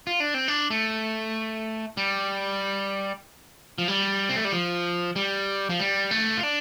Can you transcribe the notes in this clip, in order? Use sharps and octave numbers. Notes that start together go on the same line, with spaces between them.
F4
D4
C4
D4
A3
G3
F3
G3
C4
A3
G3
F3
G3
F3
G3
A3
F4
D4